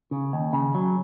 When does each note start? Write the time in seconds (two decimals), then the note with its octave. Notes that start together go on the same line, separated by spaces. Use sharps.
0.11 C#3
0.33 D#2
0.53 C#3
0.75 F#3